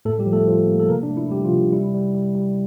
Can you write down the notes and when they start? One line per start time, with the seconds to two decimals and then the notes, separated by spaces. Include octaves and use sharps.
0.05 A2 A3 A4
0.19 G3 G4
0.26 F3
0.33 A3 A4
0.47 F3
0.68 A#3
0.80 A4
0.88 C3 A#3 A#4
1.03 D4
1.10 A3
1.17 E4
1.30 C3 G3 G4
1.45 F3 F4
1.52 C3
1.72 G3 E4
1.94 G3
2.15 G3
2.35 G3